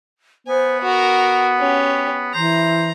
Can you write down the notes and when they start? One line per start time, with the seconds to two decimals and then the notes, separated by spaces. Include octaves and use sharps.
0.47 B3 C5 G#5
0.83 F#4 A#4 F#5
1.59 C#4 G4
2.34 E3 C5 A#5